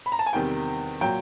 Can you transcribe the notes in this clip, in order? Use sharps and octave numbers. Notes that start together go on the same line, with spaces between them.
B5
A#5
A5
G#5
E2 C3 D#3 G3 G5
A#2 F#3 G5